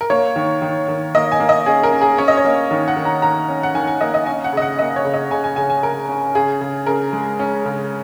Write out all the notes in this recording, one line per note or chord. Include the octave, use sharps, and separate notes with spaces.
A#4
A#3 C#5
D#3
D#3
D#3
A#3 D#5
G#5
A#3
D#5
C#4 G#4
A#4
C#4
G#4
C#4 C#5
D#5
C#5
A#3
D#3
F#5
D#3
A#5
D#3 A#5
C#4
F#5
D#3 G#5
G#5
A#3 D#5
D#5
C#4 G#5
F#5
C#3 D#5
F#5
A#3 D#5
C#5
C#3
D#5
C#3 G#5
G#5
C#3 G#5
G#5
C#3 A#4
C#4
C#3 G#4
C#3
C#3 A#4
G#3
C#4
C#3